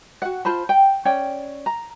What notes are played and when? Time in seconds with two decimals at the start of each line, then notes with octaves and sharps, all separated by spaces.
0.22 F#4 F#5
0.45 F4 C5 A5 B5
0.69 G5
1.05 C#4 C#5 D5 G5
1.66 A#5